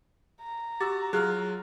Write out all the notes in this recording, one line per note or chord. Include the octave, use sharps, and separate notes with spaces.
A#5
F#4 G4 D6 E6 A6
F#3 F4 G#4 F6 F#6